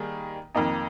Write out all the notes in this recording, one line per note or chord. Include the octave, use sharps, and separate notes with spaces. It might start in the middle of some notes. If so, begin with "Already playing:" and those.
Already playing: D#3 G3 A#3 G#4
F2 D#3 A#3 D#4